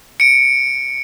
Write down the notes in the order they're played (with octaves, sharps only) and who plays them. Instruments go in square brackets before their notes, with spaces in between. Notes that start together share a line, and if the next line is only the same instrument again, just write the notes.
[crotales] C#7 D7